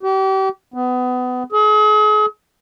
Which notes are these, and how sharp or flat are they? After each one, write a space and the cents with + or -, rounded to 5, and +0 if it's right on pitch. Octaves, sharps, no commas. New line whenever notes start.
G4 -35
B3 +25
G#4 +40